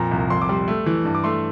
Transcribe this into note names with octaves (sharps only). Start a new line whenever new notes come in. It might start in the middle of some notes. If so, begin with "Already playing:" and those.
Already playing: F2 A#2 A#5
C2
F2 C6
D6
G3 C6
A3
E3
G2
D6
A3 C6